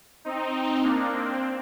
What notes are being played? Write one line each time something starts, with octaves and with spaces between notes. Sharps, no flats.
C4 D#4
A#3 D4
C4